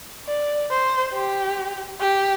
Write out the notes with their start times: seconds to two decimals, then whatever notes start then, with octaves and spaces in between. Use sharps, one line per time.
0.27 D5
0.71 C5
1.14 G4
2.01 G4